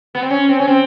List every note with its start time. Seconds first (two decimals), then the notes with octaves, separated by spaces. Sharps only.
0.15 B3
0.22 C4
0.30 C#4
0.49 C4
0.60 C#4
0.67 C4